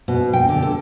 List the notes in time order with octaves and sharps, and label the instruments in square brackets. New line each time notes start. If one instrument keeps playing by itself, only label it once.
[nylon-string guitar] B2
G5
D3
A4